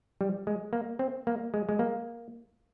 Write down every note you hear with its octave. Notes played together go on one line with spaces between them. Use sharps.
G3
G#3
A#3
C4
A#3
G#3
G#3
A#3